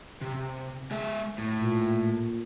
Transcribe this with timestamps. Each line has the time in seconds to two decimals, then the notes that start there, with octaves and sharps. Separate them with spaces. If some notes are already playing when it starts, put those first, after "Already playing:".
0.21 C3
0.91 G#3 G#4 E5
1.38 A2
1.58 A#2